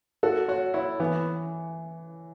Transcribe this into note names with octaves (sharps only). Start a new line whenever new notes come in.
F#4 A4
F#4 C#5
E4 C#5
E3 B3